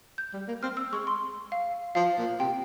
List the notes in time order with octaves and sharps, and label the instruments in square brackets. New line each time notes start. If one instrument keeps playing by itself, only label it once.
[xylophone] G6
[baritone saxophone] G3
A#3
[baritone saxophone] C4 [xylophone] F6
[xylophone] E6
[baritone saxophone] G#3 [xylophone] C#6
[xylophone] C6
F5
[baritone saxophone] F3 [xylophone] F5
[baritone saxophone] A#2
[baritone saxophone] C3 [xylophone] G5